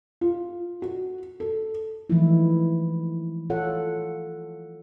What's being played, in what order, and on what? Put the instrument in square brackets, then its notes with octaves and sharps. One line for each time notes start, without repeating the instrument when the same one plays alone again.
[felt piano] F4
F#4
A4
[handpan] E3 F3 G#3 A3 D#4 E4
F4 A4 C#5 F#5